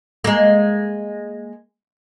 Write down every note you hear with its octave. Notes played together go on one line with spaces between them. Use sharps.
G#3 A#3